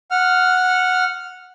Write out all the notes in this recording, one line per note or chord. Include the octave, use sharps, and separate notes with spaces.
F#5 F6